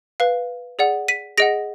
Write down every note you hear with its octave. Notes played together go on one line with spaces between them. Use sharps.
B4 F5
G#4 D5 F#5
B6 D#7
G#4 D#5 F#5 A#6 D7